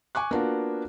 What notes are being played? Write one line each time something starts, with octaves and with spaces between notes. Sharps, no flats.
G#5 C#6 D6 F#6
A#3 B3 D4 F4 F#4